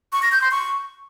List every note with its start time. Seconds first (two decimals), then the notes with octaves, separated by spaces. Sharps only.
0.13 C#6
0.22 A#6
0.32 G6
0.42 C6
0.51 C#6